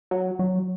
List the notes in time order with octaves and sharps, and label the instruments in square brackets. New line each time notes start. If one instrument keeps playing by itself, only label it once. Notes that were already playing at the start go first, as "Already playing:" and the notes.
[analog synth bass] F#3
F#3